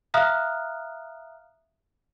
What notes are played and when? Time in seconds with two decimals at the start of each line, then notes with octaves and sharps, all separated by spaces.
0.14 E5 F5 A#5 D#6 F6 F#6